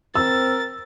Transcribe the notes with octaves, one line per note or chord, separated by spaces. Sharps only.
C4 A#4 E6 A6